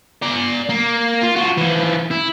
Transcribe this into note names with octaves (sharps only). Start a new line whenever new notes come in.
D5 A#5
A#3
F4
F3 F#4
E3 F3
E4